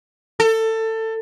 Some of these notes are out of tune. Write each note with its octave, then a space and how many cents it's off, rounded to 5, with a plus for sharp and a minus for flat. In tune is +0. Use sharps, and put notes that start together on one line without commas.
A4 +20